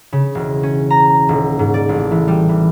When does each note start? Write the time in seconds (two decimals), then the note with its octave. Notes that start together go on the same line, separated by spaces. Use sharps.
0.12 C#3
0.35 E1
0.63 C#4
0.90 A#5
1.29 D#1
1.59 G#2
1.74 D5
1.89 A1
2.12 E3
2.28 G3
2.49 E3